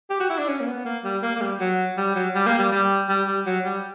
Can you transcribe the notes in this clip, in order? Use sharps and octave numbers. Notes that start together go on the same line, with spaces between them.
G4
F#4
E4
D4
C#4
A#3
B3
A#3
G3
A#3
A#3
G3
F#3
G3
F#3
G3
A#3
G3
G3
G3
G3
F#3
G3